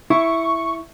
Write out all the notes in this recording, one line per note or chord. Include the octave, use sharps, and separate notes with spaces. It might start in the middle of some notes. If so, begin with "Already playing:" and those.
E4 C#6